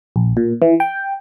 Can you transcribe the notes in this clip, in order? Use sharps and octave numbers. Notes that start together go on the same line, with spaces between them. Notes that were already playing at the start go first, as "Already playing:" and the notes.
A#1
A#2
E3
G5